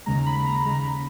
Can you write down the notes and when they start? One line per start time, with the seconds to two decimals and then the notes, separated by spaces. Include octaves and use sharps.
0.06 D#2 C#3 G#3 A#5
0.26 B5
0.46 A#5
0.66 D#2 C#3 G#3 A#5